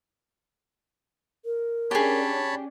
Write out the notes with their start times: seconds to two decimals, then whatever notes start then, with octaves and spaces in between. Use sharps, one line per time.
1.45 A#4
1.91 C#4 D4 G4 G#4 C#5 A5 B5